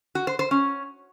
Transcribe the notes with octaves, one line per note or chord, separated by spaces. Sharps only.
F#4
C5
C5
C#4